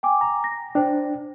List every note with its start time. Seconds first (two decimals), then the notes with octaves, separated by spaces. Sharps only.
0.03 G5 G#5 D6
0.21 A#5
0.44 A#6
0.75 D4 C5 G5